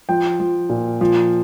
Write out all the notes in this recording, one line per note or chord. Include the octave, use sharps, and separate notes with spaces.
F3 G5
F3
A#2
F3